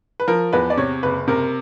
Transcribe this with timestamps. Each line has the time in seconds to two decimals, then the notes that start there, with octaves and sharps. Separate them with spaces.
0.20 B4
0.28 F3 A#4
0.53 E2 B4
0.70 D5
0.77 C3 C#5
1.03 F#1 B4
1.28 C3 A#4